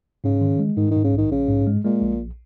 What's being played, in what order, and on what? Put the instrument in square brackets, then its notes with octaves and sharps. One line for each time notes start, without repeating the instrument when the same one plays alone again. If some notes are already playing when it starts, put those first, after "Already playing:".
[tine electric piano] G#2 [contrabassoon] C#3
[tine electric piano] D#3
G#3
[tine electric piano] G#2 [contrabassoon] D#3
[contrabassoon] D#3
[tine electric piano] G#2
[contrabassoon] C#3
[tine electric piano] A#1 [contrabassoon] D#3
[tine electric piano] A#1 [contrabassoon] C#3
[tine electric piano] G#2
G#3
[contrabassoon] A#2 [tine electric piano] G#3
[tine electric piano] A#1